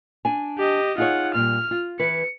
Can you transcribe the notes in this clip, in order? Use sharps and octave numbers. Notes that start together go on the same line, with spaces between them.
D4 G#5
G4 D#5
D#4 F4 G#4 C#5 F#5
A#2 G3 F6
F4
E3 B4 C#7